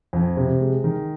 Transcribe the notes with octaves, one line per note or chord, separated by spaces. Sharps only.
F2
C3
G#3
D#3